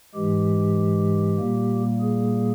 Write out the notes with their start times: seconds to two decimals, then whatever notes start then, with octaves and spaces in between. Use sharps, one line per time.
0.15 G#2 E3 G#3 G4
1.39 A#2 G3 A#3
2.01 G#4